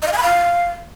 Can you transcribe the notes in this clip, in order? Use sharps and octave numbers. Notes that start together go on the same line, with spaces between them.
D#5
F5
G#5
B5
F5